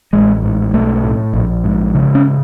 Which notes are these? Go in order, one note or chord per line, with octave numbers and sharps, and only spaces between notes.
A1 G#3
G#2
B1 A3
A2
A#1
G#2
C#3
C#4